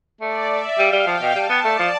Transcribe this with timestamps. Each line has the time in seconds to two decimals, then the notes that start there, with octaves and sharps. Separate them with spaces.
0.21 A3 D5
0.49 E5
0.78 G3 F5
0.92 G3
1.07 F3 G5
1.22 B2
1.35 G3 A5
1.49 B3
1.64 A3 D5
1.79 F3